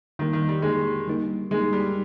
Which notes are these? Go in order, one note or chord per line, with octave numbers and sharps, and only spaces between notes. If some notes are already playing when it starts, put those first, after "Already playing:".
D3 D#3 G3 A#3 D#4
D#3
G3
D3 G3 G#3 A#3 D#4
D3 G3 A#3 D#4
D3 G3 G#3 A#3 D#4
G3